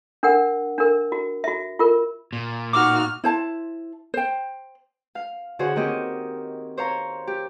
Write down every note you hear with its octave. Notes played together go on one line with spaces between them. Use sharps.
D4 A#4 F#5
D4 A#4
F#4
F#4 E5
F4 A#4
A#2
D#4 F#4 D6 F6
E4 C5 A5
C5 G5
F5
D3 F#4 G#4 C5 C#5 F#6
D#3 A#3 C4 G4 C#5 D#5
C5 C#5 F5 A#5
G4